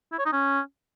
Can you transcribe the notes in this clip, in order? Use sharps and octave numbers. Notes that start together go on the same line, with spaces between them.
E4
C#5
D#4
C#4